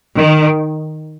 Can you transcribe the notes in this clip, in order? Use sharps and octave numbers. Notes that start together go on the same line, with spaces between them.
D#3